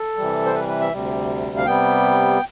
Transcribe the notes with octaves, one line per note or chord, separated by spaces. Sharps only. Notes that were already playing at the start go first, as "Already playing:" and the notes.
Already playing: A4
C3 E3 G3
C5
B4
B4
E5
D2 C3 G3
F5
C3 G3 B3 G5